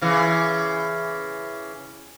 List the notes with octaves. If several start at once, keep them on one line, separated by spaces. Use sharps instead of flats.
C#3 E3